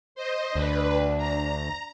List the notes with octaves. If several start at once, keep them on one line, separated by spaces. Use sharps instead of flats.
C5 D#5
D2 D4 B4
A#5